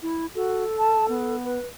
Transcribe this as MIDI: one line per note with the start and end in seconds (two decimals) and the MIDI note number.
0.02 0.26 64
0.35 0.64 66
0.35 1.36 69
0.78 1.06 81
1.08 1.59 59
1.44 1.67 71